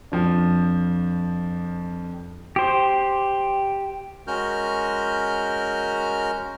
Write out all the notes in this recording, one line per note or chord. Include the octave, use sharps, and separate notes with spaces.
F2 F3 D4
G4 C5
G#3 C#4 F#4 A#4 F6 G6